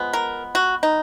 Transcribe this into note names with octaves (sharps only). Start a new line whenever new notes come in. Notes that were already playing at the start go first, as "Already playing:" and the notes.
Already playing: F3 G#3 B3
A#4
F#4
D#4